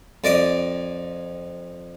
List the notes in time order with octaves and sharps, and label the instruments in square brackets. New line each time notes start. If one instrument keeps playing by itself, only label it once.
[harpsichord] F2 D5 D#5 D6 D#6